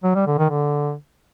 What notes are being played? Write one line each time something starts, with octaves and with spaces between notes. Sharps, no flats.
F#3
G3
D3
D#3
D3